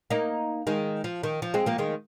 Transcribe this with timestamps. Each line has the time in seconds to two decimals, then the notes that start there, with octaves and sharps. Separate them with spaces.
0.10 A#3 D#4
0.67 D#3 G#3
1.04 F3
1.23 D#3
1.42 F3
1.54 G#3 C4
1.66 F3 A#3
1.78 D#3 G#3